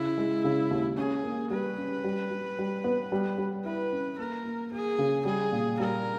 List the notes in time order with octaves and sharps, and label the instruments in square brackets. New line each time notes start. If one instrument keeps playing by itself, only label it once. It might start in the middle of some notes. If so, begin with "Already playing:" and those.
Already playing: [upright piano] C#3 [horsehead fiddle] E4
[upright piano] G#3
C#3
D#2
[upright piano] C#4 [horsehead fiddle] G#4
[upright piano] A#3
[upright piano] G3 [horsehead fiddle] B4
[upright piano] C#4
G3
G3
G3
B3
G3
G3
[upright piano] E4 [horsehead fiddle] B4
[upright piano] C#4
[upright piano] A#3 [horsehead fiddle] A#4
[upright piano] A#3
[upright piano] A#3 [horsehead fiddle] G#4
[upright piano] C#3
[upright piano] G3 [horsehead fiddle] G#4
[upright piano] A#2
[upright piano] G3 [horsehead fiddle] A#4